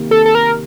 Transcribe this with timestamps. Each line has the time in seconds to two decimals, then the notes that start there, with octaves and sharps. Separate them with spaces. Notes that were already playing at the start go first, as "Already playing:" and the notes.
Already playing: C3 D#3 A#3
0.11 A4
0.26 A4
0.35 A#4